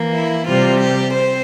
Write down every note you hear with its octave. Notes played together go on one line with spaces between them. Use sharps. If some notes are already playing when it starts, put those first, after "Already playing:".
Already playing: E3 A#3
E4
C3 G3 C4 F4
G4
C4 C5